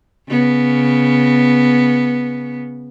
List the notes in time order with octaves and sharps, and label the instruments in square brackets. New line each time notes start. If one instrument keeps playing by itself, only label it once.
[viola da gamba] C#3 B3